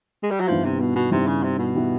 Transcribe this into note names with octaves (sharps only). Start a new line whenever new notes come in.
G#3
G3
F#3
G2 D#3 F3 G3 B3 E4
C3
B2
B2
G2 C3 D#3 G3 B3 E4
C#3
C3
B2
D#3 G3 B3 E4